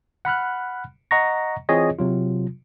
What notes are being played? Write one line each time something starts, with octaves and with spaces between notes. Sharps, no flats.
F#5 B5 F6 F#6
D#5 F#5 A#5 C#6 A#6
E3 C4 F4 G#4 C#5 D#5
C3 F#3 F4